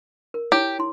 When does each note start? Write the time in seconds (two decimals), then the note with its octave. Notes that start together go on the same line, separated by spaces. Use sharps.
0.34 A#4
0.52 E4 G4 C#5
0.79 E4 C6